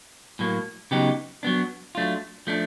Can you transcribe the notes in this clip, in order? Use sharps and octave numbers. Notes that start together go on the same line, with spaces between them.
A2 F#3 A#3
C#3 F#3 B3 D#4 G4
F#3 B3 D4
F#3 A3 D4 F4
F3 A3 D4